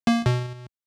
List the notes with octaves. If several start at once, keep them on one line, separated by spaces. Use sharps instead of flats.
A#3
B2